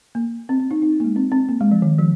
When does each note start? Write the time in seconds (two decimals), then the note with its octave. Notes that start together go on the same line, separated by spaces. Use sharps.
0.15 A#3
0.49 C4
0.60 C4
0.71 D#4
0.82 D#4
1.00 A#3
1.04 G#3
1.16 C4
1.32 C4
1.49 A#3
1.61 G#3
1.71 F3
1.82 D#3
1.99 F3